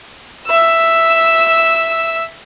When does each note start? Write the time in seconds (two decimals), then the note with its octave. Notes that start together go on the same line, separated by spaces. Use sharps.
0.47 E5 E6